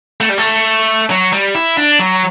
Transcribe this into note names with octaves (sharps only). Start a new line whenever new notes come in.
A3
G3
A3
F#3
G3
E4
D4
F#3